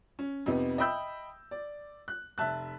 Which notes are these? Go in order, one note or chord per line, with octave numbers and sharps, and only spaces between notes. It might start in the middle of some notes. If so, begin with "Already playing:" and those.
C#4
F2 C3 B3 D#4
D#5 E5 G5 B5 E6 G6
D5
F#6
F1 E5 A5 F#6